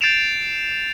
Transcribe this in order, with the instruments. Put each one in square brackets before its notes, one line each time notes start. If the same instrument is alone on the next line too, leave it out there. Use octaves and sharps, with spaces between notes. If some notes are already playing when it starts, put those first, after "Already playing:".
[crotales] G6 A6 C7 D7 E7 F7